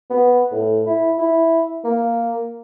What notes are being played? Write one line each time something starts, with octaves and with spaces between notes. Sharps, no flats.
B3
A2
E4
E4
A#3